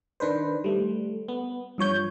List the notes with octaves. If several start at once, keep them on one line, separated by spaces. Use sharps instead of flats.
D#3 D4 B4 C5
G3 A3
B3
G2 F3 C#5 G6